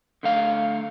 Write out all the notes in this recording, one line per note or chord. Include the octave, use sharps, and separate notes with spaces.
D3 A3 F5